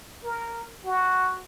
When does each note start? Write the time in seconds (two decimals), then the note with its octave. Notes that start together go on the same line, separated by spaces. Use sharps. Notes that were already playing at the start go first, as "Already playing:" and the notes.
0.24 A#4
0.85 F#4